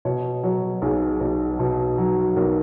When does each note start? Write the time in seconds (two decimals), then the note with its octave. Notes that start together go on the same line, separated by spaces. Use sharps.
0.05 B2 C#5
0.43 F#3 C#5
0.82 B1 G#4
1.21 B1
1.59 B2
1.98 F#3
2.36 B1 A#4